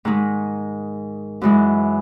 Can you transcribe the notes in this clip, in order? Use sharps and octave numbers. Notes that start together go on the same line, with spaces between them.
G#2 D#3 G#3
F#2 E3 G#3